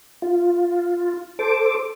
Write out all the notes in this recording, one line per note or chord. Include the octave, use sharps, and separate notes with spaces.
F4
A4 C5 D6